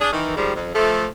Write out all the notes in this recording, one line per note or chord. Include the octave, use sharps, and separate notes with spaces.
D4 G#4
D#3 E3
D#3 F3 G3 G#3
F2
F3 A3